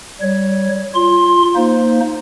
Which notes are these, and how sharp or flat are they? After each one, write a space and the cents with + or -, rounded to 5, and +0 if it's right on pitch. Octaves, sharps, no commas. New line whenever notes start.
G3 -15 C#5 +0
F4 -5 C6 +15
A#3 +0 D#4 +0 C5 +0